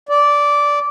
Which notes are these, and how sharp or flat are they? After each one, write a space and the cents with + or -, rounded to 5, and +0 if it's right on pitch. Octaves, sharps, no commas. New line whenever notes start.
D5 -10